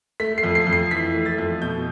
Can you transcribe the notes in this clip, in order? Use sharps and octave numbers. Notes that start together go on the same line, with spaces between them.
A3 B6
C7
F2
C7
F2
C7
E3 B6
A3
A6
F2
B2 G6